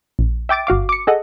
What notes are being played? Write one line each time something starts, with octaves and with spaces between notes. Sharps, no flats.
A#1
E5 G5 D6 A6 D7
G1 F#4 F5 D6
D6 C#7
G#4 A4 D#5 F#5